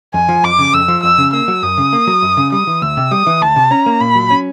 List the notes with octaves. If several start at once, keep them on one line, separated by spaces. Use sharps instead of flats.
F2 G#5
F3
F2 D6
C#3
F2 E6
F3
F2 E6
C#3
A#3 E6
F#3
F#2 D#6
C#3
A#3
F#3
F#2
C#3
G3 D#6
E3
D2 E6
C3
G3 D#6
E3
D2 A5
C3
C#4 A#5
A#3
A#2 B5
F#3
C#4